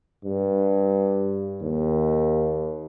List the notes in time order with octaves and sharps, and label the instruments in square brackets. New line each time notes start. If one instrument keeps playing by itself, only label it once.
[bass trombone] G2
D#2